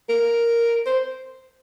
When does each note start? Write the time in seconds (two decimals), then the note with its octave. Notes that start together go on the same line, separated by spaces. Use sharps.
0.09 A#4
0.86 C5